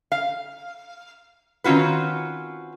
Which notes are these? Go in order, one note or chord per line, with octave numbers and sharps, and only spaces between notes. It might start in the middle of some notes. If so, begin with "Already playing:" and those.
F5
D#3 C4 C#4 F4 F#4 B4